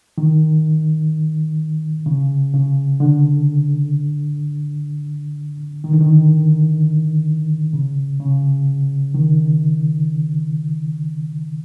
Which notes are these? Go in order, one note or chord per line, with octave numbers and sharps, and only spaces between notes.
D#3
C#3
C#3
D3
D#3
D3
D#3
C#3
C#3
D#3